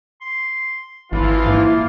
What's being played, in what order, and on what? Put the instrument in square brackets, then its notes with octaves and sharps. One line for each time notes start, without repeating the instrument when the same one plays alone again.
[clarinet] C6
[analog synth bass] G#1 [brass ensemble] E3 F3 F4 [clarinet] E4
[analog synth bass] G#2 [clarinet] A#3 [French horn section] E4